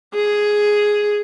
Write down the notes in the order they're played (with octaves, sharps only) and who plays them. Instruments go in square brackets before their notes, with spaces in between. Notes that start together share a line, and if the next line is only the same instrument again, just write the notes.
[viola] G#4